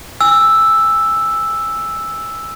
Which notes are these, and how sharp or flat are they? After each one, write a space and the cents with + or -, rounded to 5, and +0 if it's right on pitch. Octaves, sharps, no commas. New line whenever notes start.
G#5 -25 E6 +0